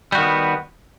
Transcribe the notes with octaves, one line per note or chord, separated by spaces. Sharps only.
D#3 G3 B3 F#4